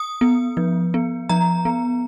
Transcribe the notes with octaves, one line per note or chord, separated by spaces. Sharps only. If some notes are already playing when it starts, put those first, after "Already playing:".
Already playing: D#6
B3
F3
B3
F3 A#5
B3